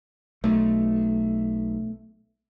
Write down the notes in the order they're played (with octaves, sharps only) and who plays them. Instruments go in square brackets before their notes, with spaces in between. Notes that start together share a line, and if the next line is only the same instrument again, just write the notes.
[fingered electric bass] B1 [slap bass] A3